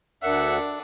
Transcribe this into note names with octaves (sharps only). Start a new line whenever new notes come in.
D2 D4 A#4 E5 F#5